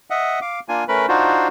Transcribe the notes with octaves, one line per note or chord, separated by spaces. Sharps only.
D#5 E5 F#5
F5 D6
A#3 D4 F4 G#5
A3 C#4 A#4 B4 B5
D4 D#4 F4 F#4 C5